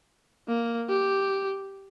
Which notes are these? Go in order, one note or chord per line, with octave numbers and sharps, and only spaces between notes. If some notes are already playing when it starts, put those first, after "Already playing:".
A#3
G4